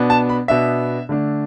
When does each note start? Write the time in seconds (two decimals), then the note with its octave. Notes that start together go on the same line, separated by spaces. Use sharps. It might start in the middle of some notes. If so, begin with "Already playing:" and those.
Already playing: B2 B3 D4
0.10 A5
0.29 B5
0.48 B2 B3 D4 E5
1.09 D3 A3 D4